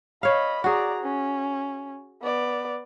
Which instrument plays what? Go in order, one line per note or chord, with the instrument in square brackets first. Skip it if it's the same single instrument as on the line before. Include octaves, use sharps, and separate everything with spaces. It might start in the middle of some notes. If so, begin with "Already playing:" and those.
[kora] C#5 F5 [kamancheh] D#5 B5
[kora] F#4 G#4 [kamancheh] D5 A#5
[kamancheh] C#4
B3 D5